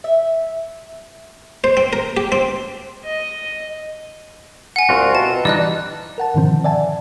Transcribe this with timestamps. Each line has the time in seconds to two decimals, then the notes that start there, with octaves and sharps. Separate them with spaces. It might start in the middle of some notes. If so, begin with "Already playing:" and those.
0.04 E5
1.64 C5
1.77 C4
1.93 A#4
2.17 G4
2.32 C4
3.05 D#5
4.76 F#5 G#5
4.89 C2 C4 F4 F#4
5.15 B2 A5
5.45 E3 G3 D4 D#4 D5 D#5 F#6
6.18 A#4 F#5 A5
6.34 G#2 B2 D3 D#3 F3 C4
6.64 D5 E5 F#5 G#5 A5